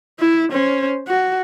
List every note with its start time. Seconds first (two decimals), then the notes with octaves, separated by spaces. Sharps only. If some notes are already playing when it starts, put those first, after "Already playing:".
0.20 E4
0.52 C#4 C5
1.08 F#4